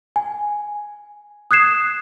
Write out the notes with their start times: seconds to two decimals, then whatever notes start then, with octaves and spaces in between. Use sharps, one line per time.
0.16 G#5
1.51 D#6 F#6 G#6 C7 E7